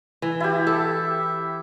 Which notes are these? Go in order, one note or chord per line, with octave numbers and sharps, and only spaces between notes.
E3
E4 F#4 G4
A4 E5